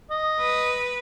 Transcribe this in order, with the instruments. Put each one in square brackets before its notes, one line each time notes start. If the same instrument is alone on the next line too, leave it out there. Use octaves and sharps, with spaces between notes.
[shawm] D#5
[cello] B4